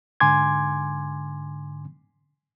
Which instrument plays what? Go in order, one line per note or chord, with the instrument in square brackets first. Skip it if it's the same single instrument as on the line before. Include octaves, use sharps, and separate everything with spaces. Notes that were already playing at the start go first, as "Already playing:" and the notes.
[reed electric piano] G#2 D3 G#5 C6 D6 G#6